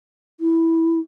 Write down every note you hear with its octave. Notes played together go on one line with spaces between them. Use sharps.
E4